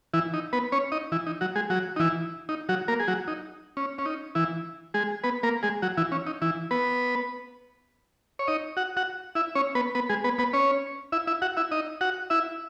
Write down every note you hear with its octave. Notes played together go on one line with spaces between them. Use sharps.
E3 E4
D#4
B3 B4
C#4 C#5
D#4 D#5
E3 E4
D#4
F#3 F#4
G#3 G#4
F#3 F#4
D#4
E3 E4
D#4
F#3 F#4
A#3 A#4
G#4
F#3 F#4
D#4
C#4
C#4
D#4
E3 E4
G#3 G#4
B3 B4
A#3 A#4
G#3 G#4
F#3 F#4
E3 E4
C#4
D#4
E3 E4
B3 B4
C#5
D#4 D#5
F#4 F#5
F#4 F#5
E4 E5
C#4 C#5
B3 B4
B3 B4
G#3 G#4
B3 B4
B3 B4
C#4 C#5
E4 E5
E4 E5
F#4 F#5
E4 E5
D#4 D#5
F#4 F#5
E4 E5